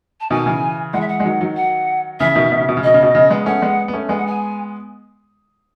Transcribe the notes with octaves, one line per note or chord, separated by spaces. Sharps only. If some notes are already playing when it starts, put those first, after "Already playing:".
A5
B2 D#3 G#5
C#3 E3
E3 G#3 F#5
E5
F#5
G#3
D#3 F#3
D#3 F#3
F#5
C#3 E3 E5
B2 D#3
B2
C#3
B2
C#3
B2 D#5
C#3
B2
C#3
G#3 B3
A3 C#4 F#5
G#3 B3
B3
A3 C#4
G#3 B3 G#5
F#5
G#5